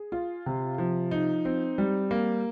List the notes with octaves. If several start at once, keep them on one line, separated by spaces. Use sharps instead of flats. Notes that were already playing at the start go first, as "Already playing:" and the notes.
Already playing: G#4
F4
C3
F3
D#4
C4
G3
A#3